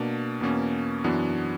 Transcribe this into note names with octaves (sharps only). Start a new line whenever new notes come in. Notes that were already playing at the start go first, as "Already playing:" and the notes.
Already playing: B2 A#3 D4
E2 B2 A#3 C#4
F#2 E3 B3 D4 F#4